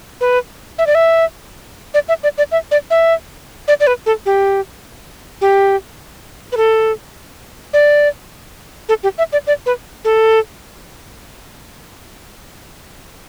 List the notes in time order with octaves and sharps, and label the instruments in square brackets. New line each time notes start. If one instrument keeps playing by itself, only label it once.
[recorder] B4
E5
D5
E5
D5
E5
D5
D5
E5
D5
E5
D5
D5
B4
A4
G4
G4
B4
A4
D5
A4
G4
E5
D5
D5
B4
A4